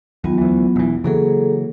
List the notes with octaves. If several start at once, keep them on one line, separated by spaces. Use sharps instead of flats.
D#2 F#3 B3 F4
D2 E3
E1 E3
C#3 E3 F#3 A#3 G#4 A4